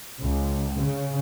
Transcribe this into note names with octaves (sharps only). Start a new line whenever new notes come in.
C#2
C#3